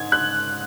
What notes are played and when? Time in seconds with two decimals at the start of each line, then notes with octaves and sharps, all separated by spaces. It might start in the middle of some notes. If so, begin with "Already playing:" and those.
Already playing: G#2 G#6
0.12 F#6